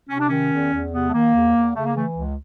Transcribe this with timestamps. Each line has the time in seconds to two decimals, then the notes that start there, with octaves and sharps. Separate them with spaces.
0.09 C3 C#4
0.19 D4
0.29 D#3 C#4
0.51 E2
0.72 E2
0.92 C3 B3
1.08 A3
1.13 D#3 A#3
1.34 E2
1.54 E2
1.75 C#3 A3
1.85 A#3
1.96 E3 A3
2.16 C#2